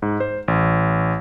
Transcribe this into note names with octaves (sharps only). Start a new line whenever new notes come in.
G#2
C5
A1